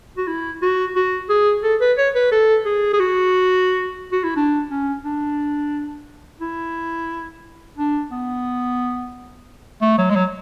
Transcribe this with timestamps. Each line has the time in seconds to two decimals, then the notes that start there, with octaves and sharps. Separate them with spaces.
0.17 F#4
0.28 E4
0.62 F#4
0.96 F#4
1.29 G#4
1.63 A4
1.81 B4
1.98 C#5
2.15 B4
2.32 A4
2.65 G#4
2.93 G#4
3.00 F#4
4.13 F#4
4.24 E4
4.36 D4
4.70 C#4
5.05 D4
6.41 E4
7.77 D4
8.12 B3
9.82 A3
9.98 F#3
10.10 G#3
10.16 F#3